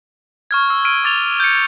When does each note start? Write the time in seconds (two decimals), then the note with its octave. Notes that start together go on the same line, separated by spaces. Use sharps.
0.51 C#6 F6 G#6
0.70 E6
0.85 F6 D7 D#7
1.04 D6 A6 F7 G7
1.40 G6 C#7